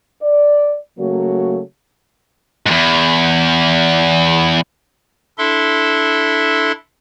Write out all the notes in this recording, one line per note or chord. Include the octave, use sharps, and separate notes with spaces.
D5
C#3 F#3 A3 A#3 F#4 C#5
E2 G#2
D4 E4 A4 E5 C6